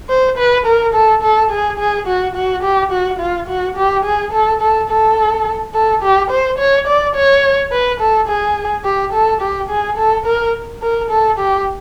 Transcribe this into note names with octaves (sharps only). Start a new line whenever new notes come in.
C5
B4
A#4
A4
A4
G#4
G#4
F#4
F#4
G4
F#4
F4
F#4
G4
G#4
A4
A4
A4
A4
G4
C5
C#5
D5
C#5
B4
A4
G#4
G4
A4
G4
G#4
A4
A#4
A#4
A4
G4